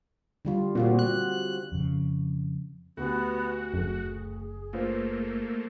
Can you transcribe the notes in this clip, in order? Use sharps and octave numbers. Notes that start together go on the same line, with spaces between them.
D3 G3 F4
A#2 C4 F4 F#4
F#6
F2 C#3
D2 B3 F#4 G4
F#1 D2 A3 G#4
A3 A#3 F4 B4 C5